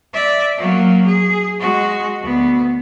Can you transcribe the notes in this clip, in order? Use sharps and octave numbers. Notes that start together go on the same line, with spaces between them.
D5 E5
F#3 A#3
G#4
G#3 F#4
D2 B3